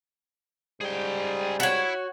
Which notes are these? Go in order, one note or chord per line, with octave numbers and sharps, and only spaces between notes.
G#2 C#3 G3 G#4 G5
E4 F#4 C#5